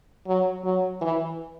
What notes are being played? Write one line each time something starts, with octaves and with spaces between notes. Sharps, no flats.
F#3
F#3
E3